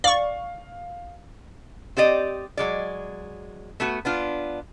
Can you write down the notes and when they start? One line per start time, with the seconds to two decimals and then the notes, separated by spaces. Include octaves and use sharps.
0.04 D5 F5 C#6
1.97 C4 G4 D5 D#5
2.57 F#3 G#3 D5
3.80 A3 B3 F#4
4.05 B3 D4 F4